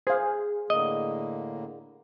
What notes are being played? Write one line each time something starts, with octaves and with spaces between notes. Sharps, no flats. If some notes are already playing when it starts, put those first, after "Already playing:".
G#4 C5 F5
A2 D3 A#3 D#5